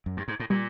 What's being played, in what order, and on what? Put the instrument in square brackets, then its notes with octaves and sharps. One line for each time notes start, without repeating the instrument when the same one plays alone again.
[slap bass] F#2
G2
G#2
A2
[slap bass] A#2 [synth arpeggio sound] G3